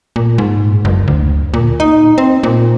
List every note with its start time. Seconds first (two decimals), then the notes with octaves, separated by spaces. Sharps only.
0.16 A#2
0.38 G#2
0.85 F#1
1.08 D2
1.54 A#2
1.80 D#4
2.18 C4
2.43 A#2